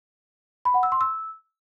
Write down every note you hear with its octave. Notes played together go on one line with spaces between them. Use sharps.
B5
F#5
E6
C6
E6